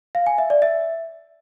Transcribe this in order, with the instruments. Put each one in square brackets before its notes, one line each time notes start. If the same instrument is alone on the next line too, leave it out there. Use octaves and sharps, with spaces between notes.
[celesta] F5
G#5
E5
D5
E5